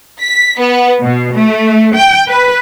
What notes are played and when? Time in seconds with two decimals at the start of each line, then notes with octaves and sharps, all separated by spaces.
0.20 B6
0.58 B3
1.02 B2
1.35 A3
1.95 G5
2.27 B4